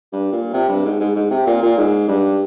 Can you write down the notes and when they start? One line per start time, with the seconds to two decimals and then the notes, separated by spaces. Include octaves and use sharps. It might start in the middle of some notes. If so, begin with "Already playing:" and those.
0.12 G2
0.32 A#2
0.53 C3
0.68 G2
0.85 G#2
1.00 G#2
1.16 G#2
1.30 C3
1.46 A#2
1.62 A#2
1.77 G#2
2.08 G2